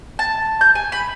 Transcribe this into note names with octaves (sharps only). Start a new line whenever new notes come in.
A5
G6
G#5
B5